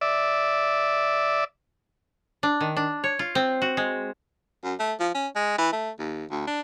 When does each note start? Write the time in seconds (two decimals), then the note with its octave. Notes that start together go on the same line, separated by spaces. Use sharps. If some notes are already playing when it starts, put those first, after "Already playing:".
0.01 D5 E5
2.43 D4
2.61 D#3
2.76 D4
3.04 C#5
3.19 F4
3.35 C4
3.62 F#4
3.77 G#3
4.64 F#2
4.80 A3
5.00 F3
5.15 C#4
5.36 G#3
5.58 E3
5.72 A3
5.99 D#2
6.31 D2
6.47 D4